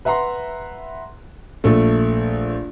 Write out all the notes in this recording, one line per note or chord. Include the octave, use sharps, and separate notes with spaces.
B4 E5 F#5 A#5 C6
A#1 A3